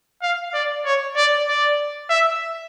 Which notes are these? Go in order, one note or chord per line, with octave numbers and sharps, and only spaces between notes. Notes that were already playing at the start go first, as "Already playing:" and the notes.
F5
D5
C#5
D5
D5
E5